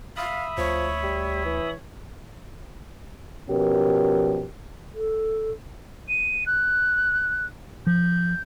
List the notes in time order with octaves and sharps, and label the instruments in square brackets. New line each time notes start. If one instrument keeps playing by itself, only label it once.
[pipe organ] E5 B5 D#6 [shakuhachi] F5
[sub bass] D2 [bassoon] F3 [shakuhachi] C#5
[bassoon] G3
E3
[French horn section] B2 F3 C#4 G4 A#4
[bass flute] A4
[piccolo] D#7
F#6
[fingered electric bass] F3 [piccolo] G6